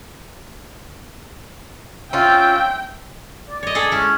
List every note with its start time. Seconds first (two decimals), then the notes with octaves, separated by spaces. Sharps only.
2.13 C4 C#4 F4 E5 G5
3.49 D5
3.63 C#5 D#5
3.75 G#4 A4
3.92 G#3 C#4 E4